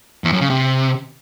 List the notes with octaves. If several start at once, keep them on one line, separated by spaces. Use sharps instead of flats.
E2
F#2
C#3
C3